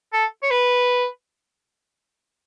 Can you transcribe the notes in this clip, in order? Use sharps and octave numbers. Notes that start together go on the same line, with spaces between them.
A4
C#5
B4